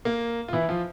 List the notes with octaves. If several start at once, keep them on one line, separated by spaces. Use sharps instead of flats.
A#3
F4
E3 E4
F3 F4